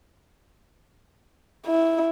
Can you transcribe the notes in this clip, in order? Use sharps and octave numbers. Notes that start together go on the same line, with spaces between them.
E4